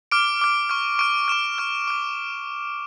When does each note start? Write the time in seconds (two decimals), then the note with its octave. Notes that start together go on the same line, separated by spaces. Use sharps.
0.12 D6 F6 D7
0.41 D6 F6
0.70 C#6 F6
0.99 C#6 F6 D7
1.28 C#6 F6 E7
1.58 C#6 F6
1.87 D6 F6 D7